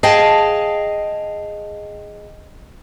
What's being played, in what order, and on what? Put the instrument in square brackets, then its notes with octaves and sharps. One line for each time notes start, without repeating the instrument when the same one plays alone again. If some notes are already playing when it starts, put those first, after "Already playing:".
[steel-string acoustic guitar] G#4 D#5 F5 G5 A5